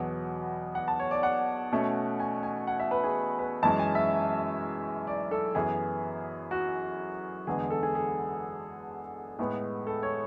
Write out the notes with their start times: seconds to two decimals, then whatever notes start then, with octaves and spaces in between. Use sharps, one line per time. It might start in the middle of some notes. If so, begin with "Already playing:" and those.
Already playing: E2 B2 F#3 B3
0.75 F#5
0.88 A5
0.99 C#5
1.11 D5
1.23 F#5
1.72 B2 A3 C#4
2.20 G#5
2.43 G#5
2.67 F#5
2.79 E5
2.91 B4
3.04 G#4
3.39 B4
3.63 F#2 E3 G#3 C#4 A5
3.79 G#5
3.95 E5
5.07 D5
5.31 A4
5.55 F#2 E3 B3 G#4
6.51 F#4
7.47 E2 D3 G#3 B3 G#4
7.70 A4
7.83 G#4
7.95 G#4
9.39 A2 G#3 B3
9.87 A4
10.03 C#5